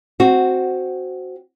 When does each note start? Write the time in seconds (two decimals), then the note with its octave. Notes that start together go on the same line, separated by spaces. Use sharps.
0.20 C4 F#4